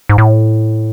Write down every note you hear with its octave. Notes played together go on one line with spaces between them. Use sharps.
G#2
A2